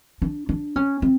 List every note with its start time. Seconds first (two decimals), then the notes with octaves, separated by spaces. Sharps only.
0.22 D4
0.49 D4
0.76 C#4
1.02 C4